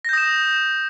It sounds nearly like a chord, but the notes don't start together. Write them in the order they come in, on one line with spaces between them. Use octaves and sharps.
A#6 G6 D#6 E7